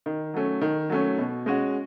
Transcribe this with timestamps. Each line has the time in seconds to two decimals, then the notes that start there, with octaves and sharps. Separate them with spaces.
0.06 D#3
0.34 F#3 A3 C#4
0.61 D#3
0.90 F#3 A3 C#4
1.18 B2
1.46 G#3 C#4 F#4